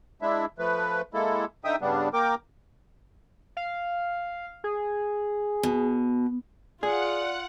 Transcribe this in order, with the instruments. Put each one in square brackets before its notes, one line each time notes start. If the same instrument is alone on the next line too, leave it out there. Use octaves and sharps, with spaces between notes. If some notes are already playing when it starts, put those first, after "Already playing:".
[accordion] G#3 D4 E4 E5
F3 A3 B4
G#3 A#3 E4 A4
D3 D#4 E5 G5 D#6
G2 C#3 G3 B3 D4
A#3 A#4 G5 D6
[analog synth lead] F5
G#4
[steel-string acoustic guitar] B2
[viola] F4 [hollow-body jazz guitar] G#4 [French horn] D5 [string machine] F#5